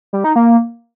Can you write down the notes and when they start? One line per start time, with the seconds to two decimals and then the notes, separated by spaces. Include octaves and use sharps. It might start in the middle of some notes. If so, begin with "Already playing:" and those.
0.13 G3
0.24 D#4
0.36 A#3